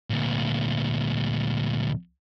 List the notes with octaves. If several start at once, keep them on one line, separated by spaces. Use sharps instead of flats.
D2 A#2